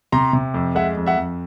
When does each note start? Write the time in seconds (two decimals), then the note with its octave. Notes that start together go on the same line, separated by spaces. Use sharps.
0.12 C3 A#5 C6
0.33 C3
0.54 F2
0.75 G#3 E5 F#5
0.97 F2
1.06 E5 F#5
1.17 F2